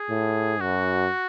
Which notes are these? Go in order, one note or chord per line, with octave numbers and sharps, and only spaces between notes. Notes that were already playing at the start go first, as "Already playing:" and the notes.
Already playing: G#4
A2
F#2 F#4